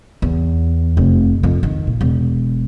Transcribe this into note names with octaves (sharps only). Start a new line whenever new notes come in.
E2
F1
F2
D#3
A#2
E1